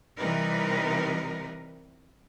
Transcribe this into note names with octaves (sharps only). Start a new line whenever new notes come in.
C3 E3 G3 D#4 A#4 B4